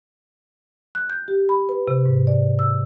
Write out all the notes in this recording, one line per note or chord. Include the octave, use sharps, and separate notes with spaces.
F#6
G6
G4
B5
B4
C3
G#2
D5
E6